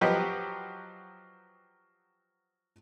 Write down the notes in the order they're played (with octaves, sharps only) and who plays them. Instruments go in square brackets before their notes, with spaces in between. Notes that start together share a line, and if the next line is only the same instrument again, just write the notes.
[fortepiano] F3 F#3 G4 B4 D#5